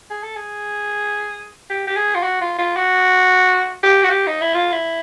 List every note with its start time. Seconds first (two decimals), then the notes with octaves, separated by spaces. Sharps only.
0.11 G#4
0.23 A4
0.36 G#4
1.70 G4
1.87 G4
1.96 G#4
2.15 F4
2.23 F#4
2.41 F4
2.58 F4
2.76 F#4
3.83 G4
4.03 F#4
4.10 G4
4.27 D#4
4.41 E4
4.55 F4
4.72 E4